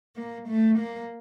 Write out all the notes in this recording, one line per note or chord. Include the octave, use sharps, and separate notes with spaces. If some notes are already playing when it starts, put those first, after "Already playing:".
A#3
A3
A#3